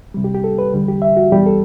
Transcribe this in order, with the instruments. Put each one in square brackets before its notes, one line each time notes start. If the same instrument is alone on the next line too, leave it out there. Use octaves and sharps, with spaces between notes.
[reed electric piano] C2 C3 G3
G4
G4
A4
B4
E2 D3 G3
G4
E5
F#4
E2 B2 G3 G4
A4